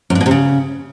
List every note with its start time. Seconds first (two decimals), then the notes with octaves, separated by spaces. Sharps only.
0.10 F#2
0.15 G2
0.21 B2
0.26 C3
0.31 C#3